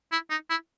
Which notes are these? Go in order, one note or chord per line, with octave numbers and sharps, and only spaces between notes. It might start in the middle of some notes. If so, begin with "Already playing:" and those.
E4
D#4
E4